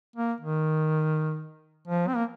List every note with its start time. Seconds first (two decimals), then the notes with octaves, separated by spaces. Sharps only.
0.16 A#3
0.40 D#3
1.87 F3
2.07 C4
2.16 A#3